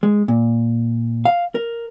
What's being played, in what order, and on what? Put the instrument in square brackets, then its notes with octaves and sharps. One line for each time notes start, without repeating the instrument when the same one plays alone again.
[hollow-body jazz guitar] G#3
A#2
F5
A#4